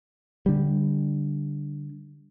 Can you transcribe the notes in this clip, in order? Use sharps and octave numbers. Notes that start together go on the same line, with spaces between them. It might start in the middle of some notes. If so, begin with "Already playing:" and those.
D3 G3